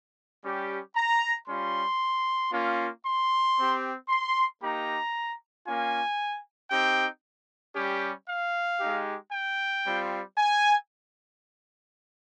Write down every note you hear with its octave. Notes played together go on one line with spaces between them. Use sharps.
G3 C#4 G4
A#5
G3 C#4 F4 C6
A#3 C#4 F4
C6
C4 G4
C6
A#3 D#4 G4 A#5
A#3 C#4 F4 G#5
C4 D#4 G4 G5
G3 C#4 G4
F5
G#3 D#4 G4
G5
G3 C4 F4
G#5